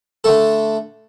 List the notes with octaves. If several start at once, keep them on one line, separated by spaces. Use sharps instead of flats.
D3 A3 A4